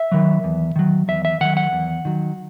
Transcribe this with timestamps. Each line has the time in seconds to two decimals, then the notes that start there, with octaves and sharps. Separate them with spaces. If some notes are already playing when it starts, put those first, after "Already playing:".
Already playing: E5
0.12 D#3 F#3
0.44 E2
0.76 D#3 F#3
1.08 E2 E5
1.25 E5
1.41 D#3 F#3 F#5
1.57 F#5
1.73 E2
2.05 D#3 F#3